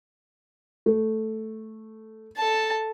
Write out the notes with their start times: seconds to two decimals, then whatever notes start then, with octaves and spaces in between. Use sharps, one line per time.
0.86 A3
2.37 A4 A5